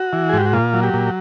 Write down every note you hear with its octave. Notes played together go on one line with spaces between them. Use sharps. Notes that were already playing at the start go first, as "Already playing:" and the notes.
Already playing: F#4
E3
G#4
G#2 G4
F#4
A#2 F4
F#3
G4
A#2